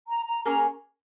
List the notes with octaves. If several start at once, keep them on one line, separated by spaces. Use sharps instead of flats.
A#5
A#5
A#3 C#4 G#4 C#5 A#5